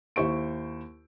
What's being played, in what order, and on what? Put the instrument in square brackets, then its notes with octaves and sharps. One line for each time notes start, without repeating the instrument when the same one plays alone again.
[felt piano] D#2 E4 C5 C#6 D7